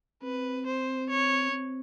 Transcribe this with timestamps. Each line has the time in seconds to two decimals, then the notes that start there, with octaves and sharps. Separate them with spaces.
0.23 C4 B4
0.67 C5
1.10 C#5
1.52 C4